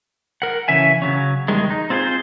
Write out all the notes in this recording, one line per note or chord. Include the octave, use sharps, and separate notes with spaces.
A#4 F#5
C#3 E3 C#4 E5 G#5
C#3 F#3 C#4
E2 D#3 G3 G#3
D#4
C4 F4 G#4 B4 C5